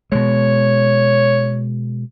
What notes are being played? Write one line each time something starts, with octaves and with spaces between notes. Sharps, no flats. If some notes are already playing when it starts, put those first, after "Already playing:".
B2 G#3 C#5